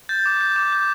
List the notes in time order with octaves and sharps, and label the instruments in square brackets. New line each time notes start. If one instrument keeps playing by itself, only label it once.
[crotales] G6 A6
D6
G6
D6
G6